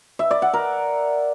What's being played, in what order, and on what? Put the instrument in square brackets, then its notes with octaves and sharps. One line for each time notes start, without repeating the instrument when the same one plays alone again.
[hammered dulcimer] E5
D5
F#5
A#4